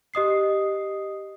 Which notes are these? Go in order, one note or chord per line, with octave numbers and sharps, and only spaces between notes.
G4 D#5 D#6 C7